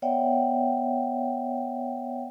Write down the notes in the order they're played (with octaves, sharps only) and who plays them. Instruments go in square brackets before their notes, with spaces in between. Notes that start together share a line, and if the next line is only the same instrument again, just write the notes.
[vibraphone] B3 C#5 D5 E5 F#5 G5